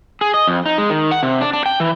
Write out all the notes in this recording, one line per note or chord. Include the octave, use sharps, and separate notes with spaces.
G#4
D#5
F2
D#4
G#3
D#3
F#5
C3
D4
D4
G5
E3